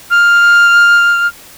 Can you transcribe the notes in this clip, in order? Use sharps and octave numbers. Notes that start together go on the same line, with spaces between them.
F6